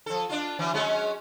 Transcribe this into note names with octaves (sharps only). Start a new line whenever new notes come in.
F3 A4
D4 F4
E3 F#3
F#3 G#3 C#4